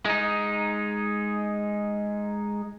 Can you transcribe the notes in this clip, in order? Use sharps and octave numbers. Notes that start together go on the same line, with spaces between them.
G#3 D#4